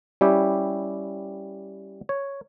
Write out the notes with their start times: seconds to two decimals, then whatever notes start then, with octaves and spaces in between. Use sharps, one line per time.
0.21 G3 C#4 E4 G4
2.09 C#5